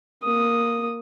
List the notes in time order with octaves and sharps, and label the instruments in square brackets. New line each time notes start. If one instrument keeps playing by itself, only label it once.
[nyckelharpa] A#3 D#6